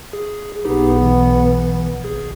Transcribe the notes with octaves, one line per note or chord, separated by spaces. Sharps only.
G#4
B1 B3 D#4 G4 G#4
E3
G#1 G#4